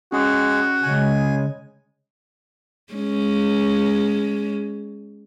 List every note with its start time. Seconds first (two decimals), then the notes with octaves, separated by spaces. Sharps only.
0.12 G#3 C#4 F#4 G#4
0.83 C#3 G#3 G#5
2.93 G#3 C#4